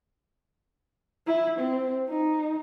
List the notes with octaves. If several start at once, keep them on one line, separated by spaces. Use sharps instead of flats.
E4
C4
D#4